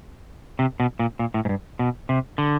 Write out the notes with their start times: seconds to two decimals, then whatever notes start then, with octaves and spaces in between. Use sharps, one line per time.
0.59 C3
0.80 B2
0.99 A#2
1.19 A#2
1.34 A2
1.45 G#2
1.49 G2
1.79 B2
2.09 C3
2.38 D3